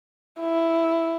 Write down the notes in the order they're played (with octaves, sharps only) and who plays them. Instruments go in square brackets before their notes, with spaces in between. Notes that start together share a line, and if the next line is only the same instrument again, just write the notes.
[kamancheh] E4